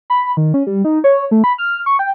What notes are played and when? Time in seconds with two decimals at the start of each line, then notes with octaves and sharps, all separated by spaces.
0.10 B5
0.37 D#3
0.54 C#4
0.67 G3
0.85 D#4
1.04 C#5
1.31 A3
1.44 B5
1.58 F6
1.86 C#6
1.99 G5